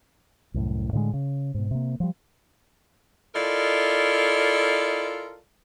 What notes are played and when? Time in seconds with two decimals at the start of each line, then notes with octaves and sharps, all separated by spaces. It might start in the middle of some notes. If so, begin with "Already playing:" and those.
0.54 C2 F#2 A2
0.93 A2 D3 E3 G#3
1.13 C#3
1.54 G#2 B2
1.71 C3 A#3
2.00 F3 G3
3.34 E4 F4 A4 A#4 D5 D#5